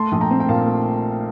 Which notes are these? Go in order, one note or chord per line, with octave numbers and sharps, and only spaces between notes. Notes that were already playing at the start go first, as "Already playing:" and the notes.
Already playing: A3 A5 C6
A#1
G5 A#5
C4
G5
A#2 F5 A5
A3